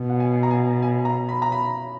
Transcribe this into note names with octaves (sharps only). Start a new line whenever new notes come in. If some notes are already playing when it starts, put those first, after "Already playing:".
Already playing: B2
F#5
G#5
A#5
G#5
G#5
A#5
B5
A#5
B5